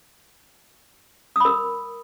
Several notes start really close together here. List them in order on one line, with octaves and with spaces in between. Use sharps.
D#6 B5 A#4